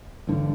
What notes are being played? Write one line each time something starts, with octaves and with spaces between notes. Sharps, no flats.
A1 G2 D3